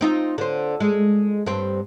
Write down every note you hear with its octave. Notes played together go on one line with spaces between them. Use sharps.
C4 D#4 F4
D3 C5
G#3
G2 C4